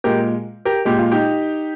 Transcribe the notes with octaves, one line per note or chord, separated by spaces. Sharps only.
A#2 G#3 G4 A#4
G4 A#4
A#2 G#3 G4
F4
D#4 G4